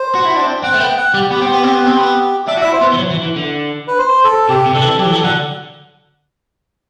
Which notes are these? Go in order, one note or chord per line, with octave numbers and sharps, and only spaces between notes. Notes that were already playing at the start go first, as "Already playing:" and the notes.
Already playing: C5
F#4
E4
D4
C4
C4 F#5
A3
B3 G5
F#5
G3 G4
B3 G4
C4
B3
C4
B3
C4
B3
D4 E5
F#4
E4 E5
C5
B3
E3
F#3
E3
E3
D3
B4
C5
A4
C3 G4
C3
D3 A4
E3
F#3 G4
E3
F#3 A4
D3 F#5